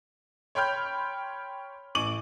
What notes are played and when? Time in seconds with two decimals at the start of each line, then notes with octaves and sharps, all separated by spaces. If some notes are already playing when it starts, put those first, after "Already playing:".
0.55 C#5 G5 B5 C6 F6 G6
1.95 A1 C#6 D6 D#7 F#7